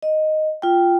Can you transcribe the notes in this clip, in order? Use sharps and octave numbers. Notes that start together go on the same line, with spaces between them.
D#5
F4 G5